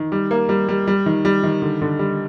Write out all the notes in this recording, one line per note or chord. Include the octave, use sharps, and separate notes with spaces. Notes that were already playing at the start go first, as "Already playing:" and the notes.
Already playing: D#3
G3
A#3
G3
G3
G3
D#3
G3
D#3
D3
D3
G3